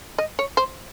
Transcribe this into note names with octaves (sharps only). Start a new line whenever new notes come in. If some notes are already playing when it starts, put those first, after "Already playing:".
D#5
C#5
C5